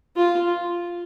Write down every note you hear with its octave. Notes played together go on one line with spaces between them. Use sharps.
F4